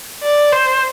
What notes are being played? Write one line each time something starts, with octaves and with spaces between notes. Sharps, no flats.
D5
C5